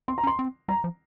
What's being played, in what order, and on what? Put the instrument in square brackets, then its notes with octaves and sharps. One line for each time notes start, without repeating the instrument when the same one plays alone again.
[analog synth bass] C4 [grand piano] C6
[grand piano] A#5
[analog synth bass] C#4
[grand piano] C6
[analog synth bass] C4
[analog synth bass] G3 [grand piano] A#5
[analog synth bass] F3